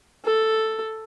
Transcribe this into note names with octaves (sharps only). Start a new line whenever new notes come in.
A4